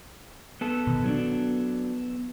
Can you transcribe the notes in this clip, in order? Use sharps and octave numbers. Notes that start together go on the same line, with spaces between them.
B3 A4
B2 D#3
F#3 C#4 D4